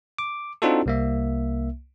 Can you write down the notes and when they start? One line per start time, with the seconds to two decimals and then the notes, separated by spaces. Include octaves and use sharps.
0.19 D6
0.62 C4 D4 D#4 F4 F#4 A4
0.86 C2 A#3 E5